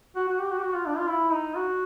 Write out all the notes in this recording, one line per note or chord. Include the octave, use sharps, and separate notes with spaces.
F#4
F#4
G4
F#4
G4
F#4
F4
D4
F4
E4
D#4
F#4